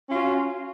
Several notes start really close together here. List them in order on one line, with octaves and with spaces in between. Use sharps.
C#4 F4 F#4